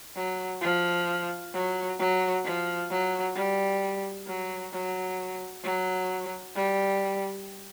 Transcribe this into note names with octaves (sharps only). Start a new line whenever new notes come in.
F#3
F3
F#3
F#3
F3
F#3
G3
F#3
F#3
F#3
G3